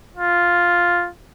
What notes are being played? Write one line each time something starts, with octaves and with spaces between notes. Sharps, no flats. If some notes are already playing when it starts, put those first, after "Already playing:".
F4